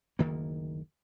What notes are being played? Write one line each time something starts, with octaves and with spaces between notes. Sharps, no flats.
F#1 D2 D#3 A#3